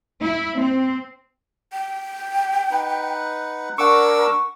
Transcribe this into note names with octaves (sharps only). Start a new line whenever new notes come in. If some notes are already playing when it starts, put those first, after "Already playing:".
E4
C4
G5
D#4 B4 F#5
D4 A#4 F#5 C#6 D6 E6